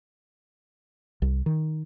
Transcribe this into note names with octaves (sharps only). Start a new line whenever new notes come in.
C2
D#3